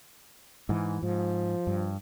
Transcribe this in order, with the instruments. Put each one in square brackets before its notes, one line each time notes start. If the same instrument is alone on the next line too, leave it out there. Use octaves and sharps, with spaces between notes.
[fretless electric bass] G#2 E3
[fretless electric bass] G#2 [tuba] F3
[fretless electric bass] G2